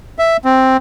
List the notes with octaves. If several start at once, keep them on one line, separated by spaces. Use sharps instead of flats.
E5
C4